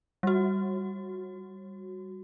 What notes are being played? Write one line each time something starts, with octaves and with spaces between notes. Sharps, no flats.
G3 F#4